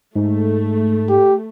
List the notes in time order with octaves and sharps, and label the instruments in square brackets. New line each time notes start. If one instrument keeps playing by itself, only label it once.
[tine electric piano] G#2 [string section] A3
[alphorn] G4